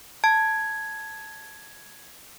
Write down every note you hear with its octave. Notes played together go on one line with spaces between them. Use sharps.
A5 G#6